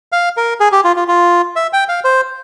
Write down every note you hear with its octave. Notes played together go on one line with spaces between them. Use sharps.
F5
A#4
G#4
G4
F4
F4
F4
E5
G5
F5
C5